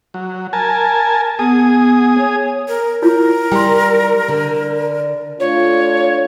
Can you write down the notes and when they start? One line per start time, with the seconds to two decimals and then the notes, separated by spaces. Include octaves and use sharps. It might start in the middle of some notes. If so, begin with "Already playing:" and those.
0.14 F#3
0.53 A#4 G#5 A5
1.39 B3 G#4 D#6
2.18 C#5
2.68 A#4
3.02 E4 F4 A#4 C#5
3.52 G3 G5 C6
4.28 D3 D4
5.39 A3 D4 F4 C#5